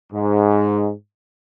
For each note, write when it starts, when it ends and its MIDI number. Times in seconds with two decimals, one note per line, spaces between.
0.13 0.92 44